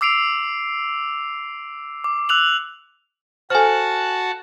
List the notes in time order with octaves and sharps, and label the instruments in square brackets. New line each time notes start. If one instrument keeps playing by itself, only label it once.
[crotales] D6 E6 C7 D7 F7
D6
E6 F#6 F7 F#7
[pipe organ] F#4 F#5 A5 [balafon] A4 C5 [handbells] G#5 F6